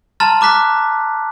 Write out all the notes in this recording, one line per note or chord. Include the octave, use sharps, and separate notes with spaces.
A5 A#5 C6 F6 A6
A#5 D6 F#6 B6